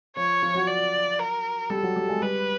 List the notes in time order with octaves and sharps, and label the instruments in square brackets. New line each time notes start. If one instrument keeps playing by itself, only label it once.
[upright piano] F3 F4 [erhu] C#5
[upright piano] F3 F4
F#3 F#4
[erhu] D5
A#4
[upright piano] G3 G4 [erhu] A4
[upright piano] F#3 F#4
G3 G4
G#3 G#4
[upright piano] G3 G4 [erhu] B4